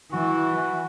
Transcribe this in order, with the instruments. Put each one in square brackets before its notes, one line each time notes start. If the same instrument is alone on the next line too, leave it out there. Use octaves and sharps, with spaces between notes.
[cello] E3 [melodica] F#4